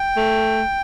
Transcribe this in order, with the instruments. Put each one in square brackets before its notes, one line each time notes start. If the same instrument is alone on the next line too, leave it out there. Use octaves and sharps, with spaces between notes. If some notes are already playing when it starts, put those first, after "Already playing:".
Already playing: [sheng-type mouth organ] G5
[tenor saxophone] A3